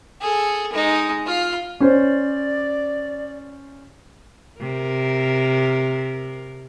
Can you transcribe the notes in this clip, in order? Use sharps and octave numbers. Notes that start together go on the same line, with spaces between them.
G#4 A4
G#3 D#4
F4 F5
C#4 C5 D5
C3 A#4